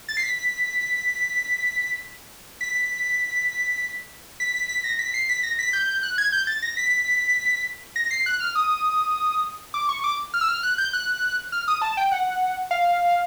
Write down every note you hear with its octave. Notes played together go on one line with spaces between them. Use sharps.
A6
C7
B6
B6
B6
B6
B6
A#6
B6
C7
B6
A#6
B6
G6
G6
F#6
G#6
G6
A6
A#6
B6
A#6
C7
F#6
F6
D#6
D6
C#6
D6
F6
E6
F6
F#6
G6
F#6
F6
D#6
A5
G5
F#5
F5